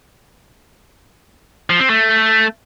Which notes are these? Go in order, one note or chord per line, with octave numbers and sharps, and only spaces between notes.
F3
C4
A3